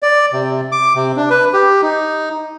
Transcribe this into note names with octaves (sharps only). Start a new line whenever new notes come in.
D5
C3
D6
C3
D4
B4
G4
D#4